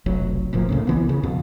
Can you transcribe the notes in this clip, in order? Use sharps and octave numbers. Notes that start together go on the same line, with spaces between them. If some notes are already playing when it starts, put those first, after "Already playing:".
F1 B1 F#3
F1 A#2 F3
C2 A2 C#3
C2 E3 B3
C#3
F2 B2